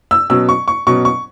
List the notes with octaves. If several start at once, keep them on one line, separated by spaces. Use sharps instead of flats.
E6
B2 F#3 C#4 E6
C#6
C#6
B2 F#3 C#4 C#6
C#6